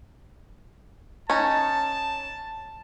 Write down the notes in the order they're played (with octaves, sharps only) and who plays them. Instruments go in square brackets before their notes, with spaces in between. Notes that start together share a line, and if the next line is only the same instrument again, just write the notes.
[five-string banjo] C#4 D#4 [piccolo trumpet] A5